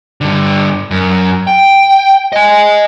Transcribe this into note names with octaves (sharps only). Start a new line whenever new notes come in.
G2 D3
F#2
G5
D#5 G#5